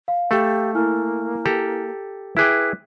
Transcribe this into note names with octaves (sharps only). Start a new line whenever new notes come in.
F5
A3 G4 A4
A#3 E4 G#5 F6
G4 A4 A#5
E4 G#4 B4 G5 D6 F#6 B6